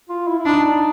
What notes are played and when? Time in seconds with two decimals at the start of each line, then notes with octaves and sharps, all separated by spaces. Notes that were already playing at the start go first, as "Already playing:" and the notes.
0.09 F4
0.27 E4
0.39 E4
0.46 D4 D#4